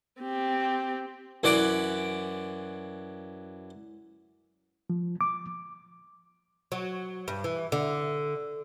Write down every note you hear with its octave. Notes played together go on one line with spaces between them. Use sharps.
C4 G4
F#2 E3 D5 F#5 D6
F3
D6
F#3
G2
E3
D3